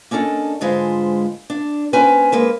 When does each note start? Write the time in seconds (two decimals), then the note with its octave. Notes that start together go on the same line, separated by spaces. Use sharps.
0.11 A#3 C#4 D4 A4 D#5
0.61 G#2 D3 G#3 F4 B4 C5
1.50 D4
1.93 A#3 C4 C#4 B4 G#5
2.32 G#2 G#3 A#3 B4